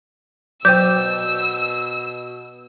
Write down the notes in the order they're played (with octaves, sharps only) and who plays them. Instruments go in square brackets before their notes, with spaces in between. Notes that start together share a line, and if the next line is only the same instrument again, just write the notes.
[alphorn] B2 [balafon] F#3 C5 G5 [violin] E6 [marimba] G6